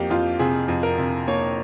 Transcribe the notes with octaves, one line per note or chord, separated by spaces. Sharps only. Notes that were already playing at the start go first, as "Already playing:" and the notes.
Already playing: F2 A#3 G4
F2 F4
C3 G#4
F2
A#4
C3
A#3 C#5